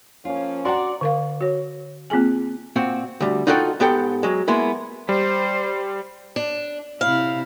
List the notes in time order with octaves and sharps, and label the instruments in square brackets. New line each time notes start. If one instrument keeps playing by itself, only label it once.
[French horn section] F3 A#3 C#4 [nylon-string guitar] F4
[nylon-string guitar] D4 F#4 [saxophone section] D5 [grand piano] F#5 A#5 C6
[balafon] D3 A#4 F5
F#4 C#5
A#3 C4 F4 G#4 G#5
[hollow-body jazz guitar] A#2 C4 F#4
D2 G3
D#4 F4 F#4 A4 D5 G5
G#2 B3 G4 A4 G5
F#3 G#3
G#3 A#3 B3 E4
[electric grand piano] G3 [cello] C5
[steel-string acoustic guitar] D4
[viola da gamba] C3 E4 [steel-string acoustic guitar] F5